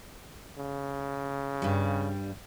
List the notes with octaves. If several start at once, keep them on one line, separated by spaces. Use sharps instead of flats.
C#3
G2 G3